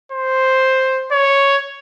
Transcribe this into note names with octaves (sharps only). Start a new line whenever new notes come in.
C5
C#5